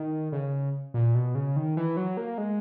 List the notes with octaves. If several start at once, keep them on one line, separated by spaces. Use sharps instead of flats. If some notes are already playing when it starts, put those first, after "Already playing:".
Already playing: D#3
C#3
A#2
B2
C#3
D#3
E3
F#3
A#3
G#3